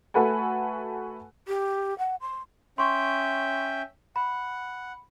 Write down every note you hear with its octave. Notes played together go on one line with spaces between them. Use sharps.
A3 F#4 A4 B4 F#5 G#5
G4
F#5
C6
C#4 E5 G5 C6 C#6
F#5 B5